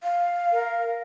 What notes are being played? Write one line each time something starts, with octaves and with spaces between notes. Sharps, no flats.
F5
A#4